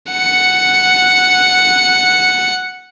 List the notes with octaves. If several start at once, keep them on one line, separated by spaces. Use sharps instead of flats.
F#5 C#7